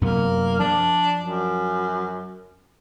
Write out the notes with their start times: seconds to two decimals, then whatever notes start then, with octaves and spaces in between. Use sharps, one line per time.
0.01 F#2 C3 A#3 B3
0.60 F3 D4
1.21 F#2